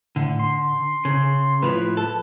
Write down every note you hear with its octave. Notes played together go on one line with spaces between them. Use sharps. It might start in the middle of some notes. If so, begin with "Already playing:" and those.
A2 D3
C6
C#3
A2 F3 B4
A4